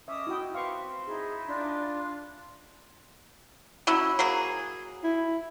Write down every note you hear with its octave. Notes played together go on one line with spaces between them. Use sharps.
C#4 D#5 E5 D6 D#6
E4 F#4 G5
C4 B4 F5 C#6 D6
D#4 E4 G#4 B5
D4 F4
F#3 C#4 E4
F#3 A#3 G#4
E4